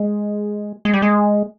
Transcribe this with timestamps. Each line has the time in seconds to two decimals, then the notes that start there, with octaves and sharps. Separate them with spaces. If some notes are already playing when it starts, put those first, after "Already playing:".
Already playing: G#3
0.85 G#3
0.94 G3
1.02 G#3